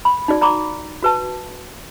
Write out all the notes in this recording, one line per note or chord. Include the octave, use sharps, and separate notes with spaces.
B5
D#4 F#4 D5
D5 A#5 B5 D6
F#4 B4 A5